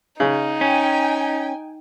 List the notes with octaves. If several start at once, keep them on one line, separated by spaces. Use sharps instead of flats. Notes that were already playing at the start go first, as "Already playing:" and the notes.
C#3 D#4
C#4 G5 G#5